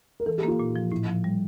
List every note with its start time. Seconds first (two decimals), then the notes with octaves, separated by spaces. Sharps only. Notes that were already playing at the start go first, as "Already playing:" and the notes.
0.20 A#4
0.26 E3 A4
0.38 G4
0.43 A#3 F4
0.59 A#2
0.76 F3
0.91 A2 E4
1.08 F3
1.24 G3